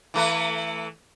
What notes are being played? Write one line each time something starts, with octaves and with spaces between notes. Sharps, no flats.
E3 A3 B4